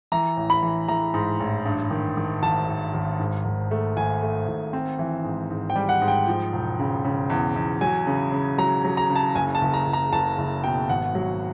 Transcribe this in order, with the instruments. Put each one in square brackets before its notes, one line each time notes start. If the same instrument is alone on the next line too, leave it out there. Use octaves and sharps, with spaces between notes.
[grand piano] E3 A#5
A1
B5
E3
E3 A#5
G#2
A1
G2
D#3
D#3
G#1 A5
G#1
G#1
G#2
G#1
A3
G#1 G#5
A3
G#1
C4
E3
G#2
G#2
G5
G3
F#5
G#2
G5
F3
E1
C#3
C#3
E2
E2
F#3 G#5
C#3
C#3
F#3 A#5
F#3
A#5
C#3
A5
F#1 G#5
A5
F#1
A#5
F#1
A#5
F#1 A5
F#1
B2 G5
G#1 F#5
F#3